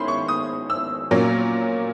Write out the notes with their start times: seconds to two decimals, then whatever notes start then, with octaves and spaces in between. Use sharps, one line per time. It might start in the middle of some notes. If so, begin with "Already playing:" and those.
Already playing: D#3 G#3 C#4 E4 B5 C6
0.08 C#6
0.28 D#6
0.70 E6
1.11 A#2 F#3 A#3 C#4